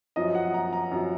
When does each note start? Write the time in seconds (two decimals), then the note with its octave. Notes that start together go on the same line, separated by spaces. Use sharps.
0.16 F#2 F3 D#5
0.35 F#5
0.54 A#5
0.73 A#5
0.91 F#2 F3